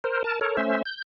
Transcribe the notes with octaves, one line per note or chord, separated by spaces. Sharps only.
A#4 C5
A#4 A5
A4 A#4 C#5
A3 C#4 C5 E5
G6